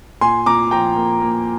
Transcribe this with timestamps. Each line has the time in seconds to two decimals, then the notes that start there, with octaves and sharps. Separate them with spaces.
0.21 A#2 G#5 C6
0.46 A#2 A#5 D6
0.71 F3 G5 A#5
0.96 A#3
1.22 A#3